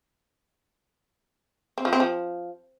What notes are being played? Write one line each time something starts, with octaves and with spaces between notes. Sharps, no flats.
C4
F3
C4
F3